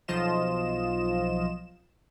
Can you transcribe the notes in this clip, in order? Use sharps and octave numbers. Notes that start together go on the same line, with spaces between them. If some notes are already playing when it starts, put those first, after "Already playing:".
B1 F3 F4 D#5 E7